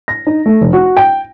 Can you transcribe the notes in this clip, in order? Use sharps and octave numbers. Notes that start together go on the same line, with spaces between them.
A#6
D#4
A3
F1
F#4
G5